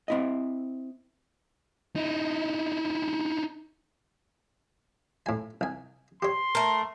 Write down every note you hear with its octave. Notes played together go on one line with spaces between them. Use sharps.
C4 E4 D#5
D#4 E4
A2 G#5
C2 G#5
G4 C#5 C6
A3 A#4